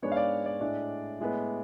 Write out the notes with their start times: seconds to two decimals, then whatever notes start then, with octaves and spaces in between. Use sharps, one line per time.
0.02 G#2 G#3 B3 D4 C#5
0.12 F5
0.17 D5
0.46 D5
0.60 A2 G#3 D4
1.20 A2 G#3 B3